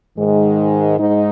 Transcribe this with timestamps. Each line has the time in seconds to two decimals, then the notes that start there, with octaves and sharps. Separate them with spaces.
0.17 G#2 D#3 G#3
0.97 G#2 G#3 D#4